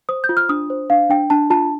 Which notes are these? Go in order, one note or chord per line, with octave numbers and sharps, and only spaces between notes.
C5 D#6
G6
F4
F6
D4 D#6
C5
D4 F5
D4 G5
D4 A5
F4 A5